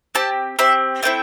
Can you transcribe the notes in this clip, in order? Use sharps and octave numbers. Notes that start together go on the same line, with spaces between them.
C4 G4 A5
C4 G4 E5
A3 C4 E4 G5